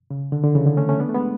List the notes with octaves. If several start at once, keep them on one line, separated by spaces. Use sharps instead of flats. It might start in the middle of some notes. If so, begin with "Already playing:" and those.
C#3
D3
D3
C#3 E3
D3
A3 C#4
A3 C#4
B3 D4
A3
G#3 B3